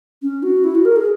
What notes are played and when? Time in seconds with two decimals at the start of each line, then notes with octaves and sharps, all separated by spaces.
0.22 C#4
0.43 F#4
0.64 E4
0.75 F#4
0.85 A#4
0.96 G#4